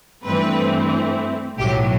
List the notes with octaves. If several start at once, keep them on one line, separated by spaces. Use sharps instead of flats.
G2 E3 A3 C4 B4
B1 A2 F#3 G4